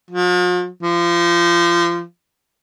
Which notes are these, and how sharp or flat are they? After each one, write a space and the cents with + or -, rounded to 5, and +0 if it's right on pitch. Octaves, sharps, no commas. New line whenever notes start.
F3 +45
F3 -25